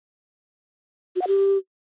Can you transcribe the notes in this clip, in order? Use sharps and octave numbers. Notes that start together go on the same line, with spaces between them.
F#4
F#5
G4